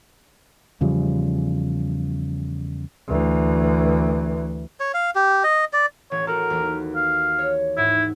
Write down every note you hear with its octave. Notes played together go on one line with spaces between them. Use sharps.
E2 C#3 F3 G3
D2 E3
C#5
F5
G4
D#5
D5
A1 C#5
F#4 A4 A#4
D#2 E3
F5
C#5
G#2 E4